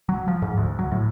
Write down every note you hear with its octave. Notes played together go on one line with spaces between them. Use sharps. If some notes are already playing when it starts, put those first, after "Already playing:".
F#3
F3
G#2
D2
F#3
A2